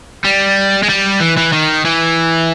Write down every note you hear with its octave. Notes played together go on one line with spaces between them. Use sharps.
G3
G#3
G3
E3
E3
D#3
E3